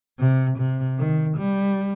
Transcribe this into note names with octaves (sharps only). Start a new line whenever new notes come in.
C3
C3
D#3
G3